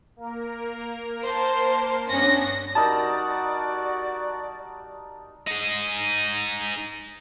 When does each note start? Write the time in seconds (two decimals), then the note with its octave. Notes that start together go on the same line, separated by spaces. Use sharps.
0.17 A#3 A#4
1.24 C5 A5 C6
2.09 G2 B3 C#4 D4 A#6
2.75 G3 D#4 F#4 A#4 D5 A5
5.47 D#4 G#4